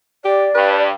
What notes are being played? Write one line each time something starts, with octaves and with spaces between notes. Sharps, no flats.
G4 D5
G2 B4